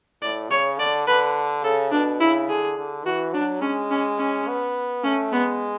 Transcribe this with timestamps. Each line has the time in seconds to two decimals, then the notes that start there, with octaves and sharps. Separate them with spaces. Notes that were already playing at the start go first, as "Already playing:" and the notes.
0.22 A2 D5
0.50 C#3 C#5
0.79 D3 D5
1.07 D3 B4
1.64 C#3 A4
1.92 B2 D4
2.20 C#3 E4
2.49 D3 G#4
2.77 D3
3.05 E3 F#4
3.33 F#3 D4
3.62 G#3 C#4
3.91 C#4
4.19 C#4
4.48 B3
5.04 A3 C#4
5.32 G#3 B3